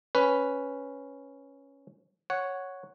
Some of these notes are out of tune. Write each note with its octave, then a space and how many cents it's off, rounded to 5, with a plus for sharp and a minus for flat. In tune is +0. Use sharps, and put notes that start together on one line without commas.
C#4 +0 B4 +0
C#5 +0 F#5 +0